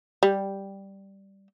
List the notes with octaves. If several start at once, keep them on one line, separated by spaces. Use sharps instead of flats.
G3